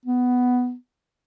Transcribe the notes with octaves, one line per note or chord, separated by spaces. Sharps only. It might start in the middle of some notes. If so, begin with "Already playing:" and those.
B3